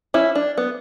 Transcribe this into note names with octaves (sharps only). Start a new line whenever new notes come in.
C#4 E4
D4
B3